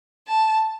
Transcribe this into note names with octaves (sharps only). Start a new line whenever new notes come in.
A5